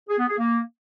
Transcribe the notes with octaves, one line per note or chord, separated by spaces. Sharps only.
G#4
B3
G#4
A#3